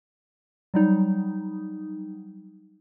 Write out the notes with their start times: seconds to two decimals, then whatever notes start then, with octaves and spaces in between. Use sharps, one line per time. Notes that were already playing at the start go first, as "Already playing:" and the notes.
0.74 F#3 G3 D#4